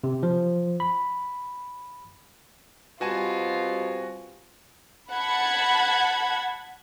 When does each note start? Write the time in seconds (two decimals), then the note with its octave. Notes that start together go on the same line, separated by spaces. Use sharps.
0.04 C3
0.23 F3
0.80 B5
3.01 B2 G3 C4 F4 F#4 G#5 A5
5.10 F#5 A5 B5 G#6